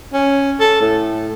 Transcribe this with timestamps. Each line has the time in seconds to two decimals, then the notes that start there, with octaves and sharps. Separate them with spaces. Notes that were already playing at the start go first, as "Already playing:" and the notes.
0.14 C#4
0.60 A4
0.81 A2